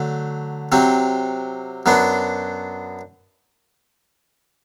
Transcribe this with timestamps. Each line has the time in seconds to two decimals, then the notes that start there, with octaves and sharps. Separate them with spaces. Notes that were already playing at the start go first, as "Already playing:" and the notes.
Already playing: D3 F#3 A3
0.72 C3 F#3 C4
1.86 F#2 F#3 B3 D4